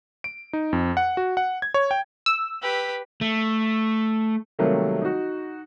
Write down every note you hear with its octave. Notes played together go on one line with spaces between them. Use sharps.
D7
D#4
F2
F#5
F#4
F#5
G#6
C#5
G5
E6
G4 B4
A3
C3 D#3 F#3 G3 A3 A#3
D#4 F#4